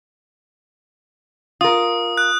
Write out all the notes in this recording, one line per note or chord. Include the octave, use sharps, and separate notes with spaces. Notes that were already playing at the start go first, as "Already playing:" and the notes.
F4 A#4 D#6
F#6